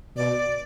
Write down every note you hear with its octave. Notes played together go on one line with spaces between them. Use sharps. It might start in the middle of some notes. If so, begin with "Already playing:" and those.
B2 D5